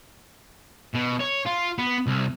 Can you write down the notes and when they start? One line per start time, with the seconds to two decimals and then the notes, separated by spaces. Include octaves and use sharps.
0.94 B2
1.20 C#5
1.46 F4
1.78 B3
2.07 C2